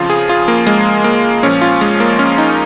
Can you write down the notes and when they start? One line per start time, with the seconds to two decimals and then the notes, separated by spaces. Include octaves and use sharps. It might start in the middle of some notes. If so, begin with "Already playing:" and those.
Already playing: F2 C#3 F3 F4
0.10 G#4
0.29 F4
0.48 A#3
0.67 G#3
1.04 A#3
1.43 A#2 F3 C#4
1.61 F4
1.81 G#3
2.00 A#3
2.19 C#4
2.38 D#4